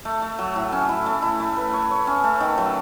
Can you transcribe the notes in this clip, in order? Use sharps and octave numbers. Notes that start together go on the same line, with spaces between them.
A3
A3
F#3
A2
C#4
E4
A3
E4
A3
B4
C#5
C#5
C#4
A3
D#3
F#3